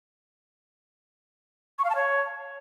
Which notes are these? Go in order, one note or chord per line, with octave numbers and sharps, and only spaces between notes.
C#6
F5
A5
C#5